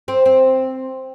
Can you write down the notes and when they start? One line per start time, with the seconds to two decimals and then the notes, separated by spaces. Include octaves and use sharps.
0.08 C4
0.26 C4